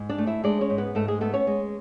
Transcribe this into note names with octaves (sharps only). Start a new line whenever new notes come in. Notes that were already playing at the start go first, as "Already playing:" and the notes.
Already playing: G#2
D4 D5
A3
E4 E5
G#3 D4 D5
C#4 C#5
G#2
B3 B4
G#2 A3 A4
G#3 G#4
A3 B3 A4
C#4 C#5
G#3